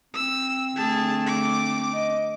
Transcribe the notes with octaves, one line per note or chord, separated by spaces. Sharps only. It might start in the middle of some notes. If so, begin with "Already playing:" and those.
C4 E6
D3 A3 G#4 A5
D6
D#5